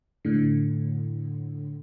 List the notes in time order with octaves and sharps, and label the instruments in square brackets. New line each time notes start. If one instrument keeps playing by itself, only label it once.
[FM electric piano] A2 D3